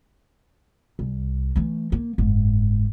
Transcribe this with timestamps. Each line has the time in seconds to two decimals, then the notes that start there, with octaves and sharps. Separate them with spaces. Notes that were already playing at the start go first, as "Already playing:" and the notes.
0.99 C2
1.56 E3 A3
1.92 A#3
2.18 F#1 G#2